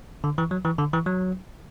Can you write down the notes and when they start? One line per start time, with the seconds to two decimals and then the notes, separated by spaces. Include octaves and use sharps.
0.24 D3
0.38 E3
0.51 F#3
0.65 E3
0.79 D3
0.93 E3
1.06 F#3